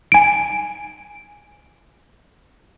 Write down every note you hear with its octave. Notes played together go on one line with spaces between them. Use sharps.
G#5 D7